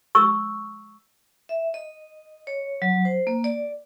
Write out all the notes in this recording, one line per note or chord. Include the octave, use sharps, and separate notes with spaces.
C#6 E6
E5
D#5
C#5
F#3
C5
A#3
D5